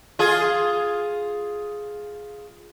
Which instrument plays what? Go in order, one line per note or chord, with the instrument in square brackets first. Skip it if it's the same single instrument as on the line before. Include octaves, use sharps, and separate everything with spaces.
[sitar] F4 G#4